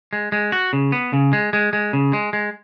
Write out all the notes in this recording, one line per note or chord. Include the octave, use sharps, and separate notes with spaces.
G#3
G#3
F#4
C#3
B3
C#3
G#3
G#3
G#3
C#3
G#3
G#3